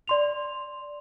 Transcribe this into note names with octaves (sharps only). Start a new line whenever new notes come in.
D5 C6 F7